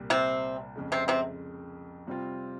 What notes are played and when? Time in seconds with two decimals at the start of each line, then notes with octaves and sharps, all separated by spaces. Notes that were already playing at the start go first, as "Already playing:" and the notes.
Already playing: C2 A#2 G3
0.10 C3 C4
0.76 F2 C#3 G#3
0.92 C3 C4
1.08 C3 C4
2.07 C3 G3 C4 F4